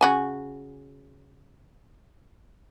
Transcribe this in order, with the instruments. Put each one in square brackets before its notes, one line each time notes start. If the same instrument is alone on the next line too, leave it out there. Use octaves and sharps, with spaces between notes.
[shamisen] C#3 F#4 G#5